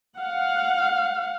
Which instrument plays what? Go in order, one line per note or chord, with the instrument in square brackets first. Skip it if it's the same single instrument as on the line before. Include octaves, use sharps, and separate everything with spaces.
[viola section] F5 F#5